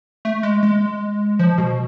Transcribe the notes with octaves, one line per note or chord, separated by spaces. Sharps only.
A3
G#3
G#3
F3
B2